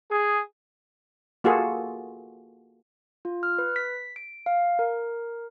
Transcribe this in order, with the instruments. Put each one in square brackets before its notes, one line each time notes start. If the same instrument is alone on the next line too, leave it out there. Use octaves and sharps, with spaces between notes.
[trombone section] G#4
[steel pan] A#3 F4 F#4 G#4 A4
[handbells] F4
F6
B4
B6
D7
F5
A#4